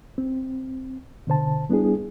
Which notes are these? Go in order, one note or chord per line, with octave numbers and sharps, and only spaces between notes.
C4
B2 D3 C5 A5
G3 B3 D4 E4 G#4